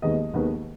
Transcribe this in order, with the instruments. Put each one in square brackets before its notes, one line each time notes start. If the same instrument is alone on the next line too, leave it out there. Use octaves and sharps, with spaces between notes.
[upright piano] D#2 D#3 G#3 B3 D#5
D#2 D#3 G#3 B3